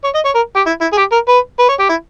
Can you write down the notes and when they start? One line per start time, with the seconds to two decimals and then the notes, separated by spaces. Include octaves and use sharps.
0.04 C#5
0.15 D#5
0.25 C#5
0.35 A#4
0.56 G4
0.66 E4
0.81 E4
0.93 G#4
0.97 G4
1.12 A#4
1.28 B4
1.59 B4
1.69 C#5
1.79 G4
1.89 E4